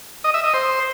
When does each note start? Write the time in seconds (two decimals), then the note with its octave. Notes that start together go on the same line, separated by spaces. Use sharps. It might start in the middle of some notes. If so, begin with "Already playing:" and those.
0.24 D#5
0.34 E5
0.44 D#5
0.54 C5